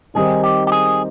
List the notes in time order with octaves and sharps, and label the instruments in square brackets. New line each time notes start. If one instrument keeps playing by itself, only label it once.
[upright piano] D#3 G3 C4 D#4 [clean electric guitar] G#4
[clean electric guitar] G4
G4
G#4